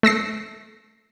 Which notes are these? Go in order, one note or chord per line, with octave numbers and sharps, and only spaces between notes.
A3 E6 A#6 C7